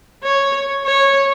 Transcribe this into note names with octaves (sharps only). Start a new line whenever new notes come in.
C#5
C#5